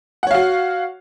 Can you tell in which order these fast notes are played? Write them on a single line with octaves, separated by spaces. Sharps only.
F#5 C#5 F5 F#4